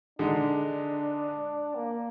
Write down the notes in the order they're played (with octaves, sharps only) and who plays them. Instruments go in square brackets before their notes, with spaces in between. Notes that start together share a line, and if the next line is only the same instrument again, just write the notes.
[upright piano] D3 G#3 D#4 [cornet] D4
[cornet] A#3